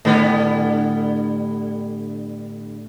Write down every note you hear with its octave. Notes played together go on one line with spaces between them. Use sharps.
A2 D3 G3 B3